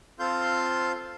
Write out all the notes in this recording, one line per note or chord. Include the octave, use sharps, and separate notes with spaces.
C4 F4 A4 F5 C6 G6